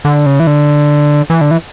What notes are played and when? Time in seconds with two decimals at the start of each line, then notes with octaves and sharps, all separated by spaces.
0.05 D3
0.26 C#3
0.40 E3
0.47 D3
1.30 E3
1.41 D3
1.51 E3